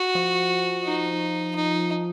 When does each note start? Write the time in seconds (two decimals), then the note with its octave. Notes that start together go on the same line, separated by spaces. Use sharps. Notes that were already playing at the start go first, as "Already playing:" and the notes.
Already playing: F#4
0.15 F3
0.85 D#4
1.55 D#4